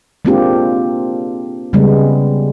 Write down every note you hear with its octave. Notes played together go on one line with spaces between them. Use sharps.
G#3 A#3 C4 D4 F4 G4
C#3 G3 G#3 B3